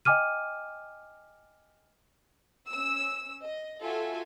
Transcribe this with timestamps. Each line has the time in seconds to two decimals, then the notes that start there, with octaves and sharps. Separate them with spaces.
0.05 D#5 G5 G#5 D6 F6 D#7
2.70 C#4 E6
3.43 D#5
3.82 F4 F#4 A4 E5 G#5